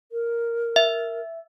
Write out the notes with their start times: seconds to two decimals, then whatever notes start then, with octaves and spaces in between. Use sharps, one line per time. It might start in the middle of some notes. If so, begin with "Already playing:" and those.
0.12 A#4
0.76 E5